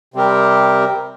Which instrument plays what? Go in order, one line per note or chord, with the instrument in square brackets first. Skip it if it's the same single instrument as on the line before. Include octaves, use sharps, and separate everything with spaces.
[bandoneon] C3 G3 C4 G4 A#4